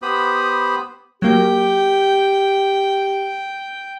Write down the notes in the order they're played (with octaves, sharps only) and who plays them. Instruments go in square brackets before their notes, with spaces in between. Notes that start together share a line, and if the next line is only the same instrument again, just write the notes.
[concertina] B3 G4 C5 B5 D#6
[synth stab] F#3 A#3 [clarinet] G4 [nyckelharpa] G5